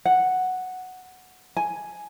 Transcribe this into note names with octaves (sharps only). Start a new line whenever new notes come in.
F#5
G#5